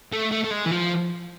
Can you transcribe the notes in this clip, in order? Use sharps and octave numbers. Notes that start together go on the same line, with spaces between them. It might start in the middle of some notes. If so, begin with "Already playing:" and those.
A3
A3
A3
G#3
E3
F3